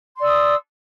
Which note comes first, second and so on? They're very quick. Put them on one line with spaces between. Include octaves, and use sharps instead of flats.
C6 D5 E6 D#6